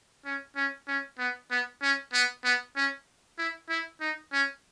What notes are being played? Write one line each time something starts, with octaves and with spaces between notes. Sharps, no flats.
C#4
C#4
C#4
B3
B3
C#4
B3
B3
C#4
E4
E4
D#4
C#4